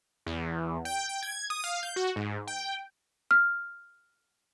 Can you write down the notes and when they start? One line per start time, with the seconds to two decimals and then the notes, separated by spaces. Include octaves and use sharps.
0.26 E2
0.85 G5
1.09 G5
1.23 G#6
1.50 D#6
1.64 F5
1.83 G6
1.96 F#4
2.16 G#2
2.47 G5
3.31 F6